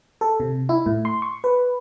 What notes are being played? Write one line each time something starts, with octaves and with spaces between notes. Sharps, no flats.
A4
C3
E4
A2
C6
C#6
B4